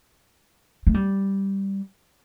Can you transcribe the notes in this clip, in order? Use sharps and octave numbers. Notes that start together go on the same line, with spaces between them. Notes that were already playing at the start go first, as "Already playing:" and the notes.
A3
G3